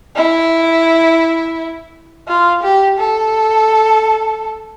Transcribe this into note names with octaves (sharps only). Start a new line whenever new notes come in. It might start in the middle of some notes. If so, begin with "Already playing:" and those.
E4
F4
G4
A4